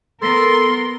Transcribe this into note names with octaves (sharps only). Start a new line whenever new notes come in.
B3 A4 A#4 C6